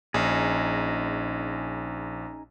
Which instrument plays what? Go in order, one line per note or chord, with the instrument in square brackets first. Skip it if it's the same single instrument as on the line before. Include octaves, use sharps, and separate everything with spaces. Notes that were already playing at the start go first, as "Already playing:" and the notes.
[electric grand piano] A#1 [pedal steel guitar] C#4 D#4 G#4